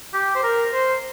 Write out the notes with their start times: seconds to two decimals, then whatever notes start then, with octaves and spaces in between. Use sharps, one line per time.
0.14 G4
0.36 C5
0.43 A#4
0.73 C5